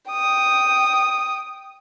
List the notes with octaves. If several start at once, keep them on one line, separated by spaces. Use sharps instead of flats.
G5 D#6